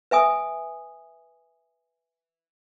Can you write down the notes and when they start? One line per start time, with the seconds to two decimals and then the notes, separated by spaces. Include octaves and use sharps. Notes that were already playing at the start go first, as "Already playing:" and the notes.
0.11 B4 E5 G#5 D#6